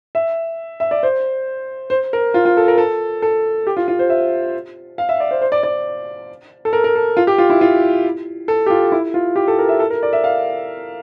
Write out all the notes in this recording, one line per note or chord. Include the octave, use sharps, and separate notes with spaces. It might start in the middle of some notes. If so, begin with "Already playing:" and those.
E5
E5
D5
C5
C5
A#4
F4
F4
A4
A#4
A4
A4
G4
F4
F4
C5
E5
F5
E5
D5
C5
C5
D5
D5
A4
A#4
A#4
A4
F4
G4
F4
E4
F4
A4
G4
F4
E4
F4
G4
A4
A#4
E5
A4
A#4
D5
E5
F5